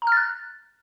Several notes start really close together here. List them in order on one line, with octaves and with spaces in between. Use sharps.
A#5 F6 A6 F#6